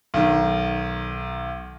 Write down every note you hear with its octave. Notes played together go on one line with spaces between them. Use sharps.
B1 D#3